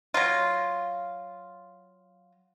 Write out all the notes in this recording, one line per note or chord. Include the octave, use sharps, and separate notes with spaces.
F#3 F4